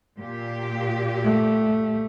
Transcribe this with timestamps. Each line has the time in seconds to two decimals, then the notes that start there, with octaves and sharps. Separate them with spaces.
0.19 A#2 G4
1.24 A3